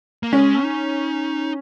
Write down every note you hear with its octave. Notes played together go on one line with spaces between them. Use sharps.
A#3
G#3 C#4
D#4